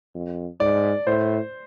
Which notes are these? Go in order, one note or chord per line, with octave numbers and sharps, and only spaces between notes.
F2
G#2 D5
A2 C5